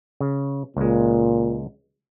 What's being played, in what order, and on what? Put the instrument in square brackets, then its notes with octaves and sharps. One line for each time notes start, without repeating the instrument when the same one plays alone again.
[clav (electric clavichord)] C#3
[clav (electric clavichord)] C#2 G#3 [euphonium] A#2